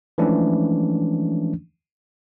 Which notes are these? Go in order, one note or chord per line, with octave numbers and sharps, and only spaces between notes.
E3 F3 G#3 A3 C#4 D4